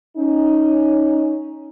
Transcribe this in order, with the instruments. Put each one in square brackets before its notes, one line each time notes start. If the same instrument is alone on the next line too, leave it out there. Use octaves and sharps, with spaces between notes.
[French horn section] C#4 D#4